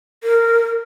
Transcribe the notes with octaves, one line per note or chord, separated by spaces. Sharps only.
A#4